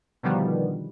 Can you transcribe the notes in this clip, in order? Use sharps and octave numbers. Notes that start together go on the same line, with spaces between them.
B2 D3 D#3 F3 G3 B3